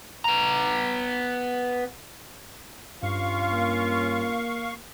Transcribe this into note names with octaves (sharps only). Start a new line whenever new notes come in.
B3 A#5
G2 C#4 F4 F5 C#6
A#3